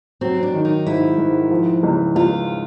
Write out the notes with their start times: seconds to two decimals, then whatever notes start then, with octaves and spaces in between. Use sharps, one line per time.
0.21 F#3 C4
0.43 D4
0.54 D#3
0.65 D#4
0.86 G#2 E4
1.18 G#2
1.51 F3
1.83 C#2
2.16 C#2 F4